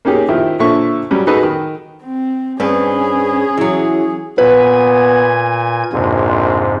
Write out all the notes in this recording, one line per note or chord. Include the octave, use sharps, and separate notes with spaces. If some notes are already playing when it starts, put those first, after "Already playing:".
A#3 C#4 D#4 G4 G#4
D#3 F3 E4
A#2 D3 F3 A4 E5 C#6
F#3 G3 C#4
D#4 F#4 G#4 A4 B4 D#5
D#3
C4
G2 C4 C#4 G#4 B4
E3 F#3
A#2 B3 B4 G#5 G#6
A#1 F2 G#2 C3